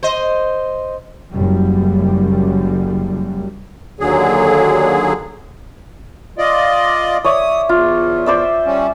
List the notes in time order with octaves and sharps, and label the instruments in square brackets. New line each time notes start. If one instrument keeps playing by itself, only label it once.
[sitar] C5 D#5
[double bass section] F#1 F#2 G3
[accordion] D#2 D3 F#3 G#4
F4 D5 D#5
[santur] C#5 D5 E5 [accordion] D#6
[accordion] E2 [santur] F4
[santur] C5 D5 E5
[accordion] G3 C#4